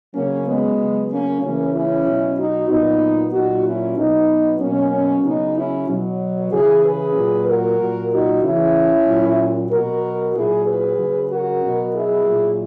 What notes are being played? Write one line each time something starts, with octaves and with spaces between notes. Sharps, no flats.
C#3 F#3 A#3 C#4
G#3 B3
C#3 F#3
A#3 C#4
C#3 E3 A#3 C#4
C#4 E4
B2 F#3
D#4 F#4
A#2 F#3 B3 D#4
A#2 F#3 D#4 F#4
C#4 E4
B2 F#3 B3 D#4
B2 F#3 A#3 C#4
C#3 F#3 B3 D#4
C#4 E4
B2 F#3
C#3 E3 E4 G#4
G#4 B4
A#2 F#3
F#4 A#4
A#2 F#3
D#4 F#4
C#3 E3 C#4 E4
A#2 F#3
B2 F#3 F#4 A#4
A#2 F#3 E4 G#4
G#4 B4
C#3 F#3
F#4 A#4
B2 F#3
E4 G#4
A#2 F#3